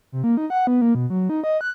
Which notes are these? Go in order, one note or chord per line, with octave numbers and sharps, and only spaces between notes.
C3
A#3
D#4
F#5
B3
A#3
B2
F#3
D#4
D#5
F#6